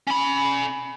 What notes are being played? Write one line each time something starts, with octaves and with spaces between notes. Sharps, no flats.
C#4 B5